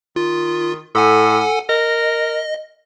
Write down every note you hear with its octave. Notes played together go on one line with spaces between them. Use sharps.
D#3 F4
A2 A4 F#5 G#5
A#4 D#5